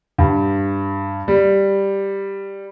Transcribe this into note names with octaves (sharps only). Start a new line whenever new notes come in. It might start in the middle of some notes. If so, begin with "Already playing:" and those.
G2
G3